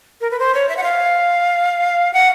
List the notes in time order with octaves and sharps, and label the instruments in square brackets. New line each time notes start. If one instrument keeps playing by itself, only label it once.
[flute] A#4
B4
C5
C#5
E5
F#5
F5
F#5